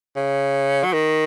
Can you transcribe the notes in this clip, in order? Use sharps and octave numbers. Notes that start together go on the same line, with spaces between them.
C#3
F#3
D#3